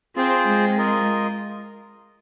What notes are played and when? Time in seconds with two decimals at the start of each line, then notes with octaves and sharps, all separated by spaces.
0.16 C4 F4 G#4 C5 G5
0.46 G#3
0.78 F4 A#4 D#5